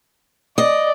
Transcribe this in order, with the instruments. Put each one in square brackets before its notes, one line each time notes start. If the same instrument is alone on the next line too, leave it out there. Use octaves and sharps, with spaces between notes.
[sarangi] D5 [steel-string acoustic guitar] D#5